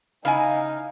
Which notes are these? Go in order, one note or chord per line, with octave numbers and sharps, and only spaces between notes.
C#3 D#4 E4 F5 G#5